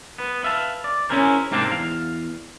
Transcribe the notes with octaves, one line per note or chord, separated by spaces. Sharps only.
B3 B4
B4 E5 F5 A5
D5
C#4 D#4 E4 G#4 A#4 C5
G#2 C3 A#3 C4 D4
E2 F5